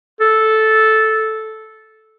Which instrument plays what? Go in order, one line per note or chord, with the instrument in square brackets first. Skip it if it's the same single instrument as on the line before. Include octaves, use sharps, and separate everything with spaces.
[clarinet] A4